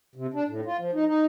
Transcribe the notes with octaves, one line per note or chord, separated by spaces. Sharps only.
C3
D4
A2
F4
F3
D#4
D#4